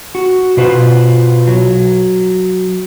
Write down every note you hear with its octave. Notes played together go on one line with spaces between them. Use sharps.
F#4
B2 F4 B4 C5
F#3